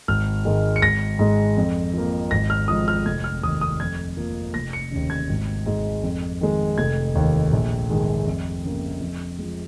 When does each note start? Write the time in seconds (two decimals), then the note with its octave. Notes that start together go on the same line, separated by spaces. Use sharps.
0.08 G#1 F6
0.45 G#2 D#3 G#3
0.76 C#7
0.82 G#1 A#6
1.19 G#2 G#3
1.57 F2
1.94 F3 A#3
2.31 G#1 A#6
2.50 F6
2.68 G#2 F3 D#6
2.88 F6
3.06 F1 G#6
3.24 F6
3.42 D#2 D#3 D#6
3.61 D#6
3.80 F2 G#6
4.17 F3 A#3
4.54 F1 A#6
4.73 C#7
4.91 D#2 C#3
5.10 G#6
5.29 G#1
5.66 G#2 G#3
6.03 F2
6.41 D#3 G#3
6.78 F1 G#6
7.15 D#2 D#3
7.53 A#1
7.90 G#2 D#3 G#3
8.27 F2
8.64 C#3 A#3
9.01 F2
9.39 F3 G#3